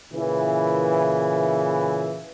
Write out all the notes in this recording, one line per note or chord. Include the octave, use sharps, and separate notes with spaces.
A#2 C#3 E3